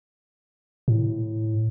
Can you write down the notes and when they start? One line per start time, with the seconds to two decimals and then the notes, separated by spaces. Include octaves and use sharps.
0.88 A2